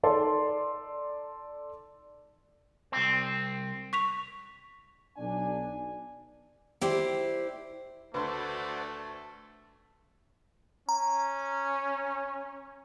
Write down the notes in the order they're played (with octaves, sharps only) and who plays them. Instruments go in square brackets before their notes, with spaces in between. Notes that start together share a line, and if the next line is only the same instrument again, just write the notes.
[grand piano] D#4 A4 D5 A5 C6
[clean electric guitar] C2 C4
[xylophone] C#6 B6 F7
[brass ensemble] B1 D4 D5 G#5
[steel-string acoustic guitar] E4 G4 C5 D5
[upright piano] D2 C6 [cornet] A3 [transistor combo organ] F#4 C5 D5 [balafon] B4 B5
[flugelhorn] C#4 [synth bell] A#5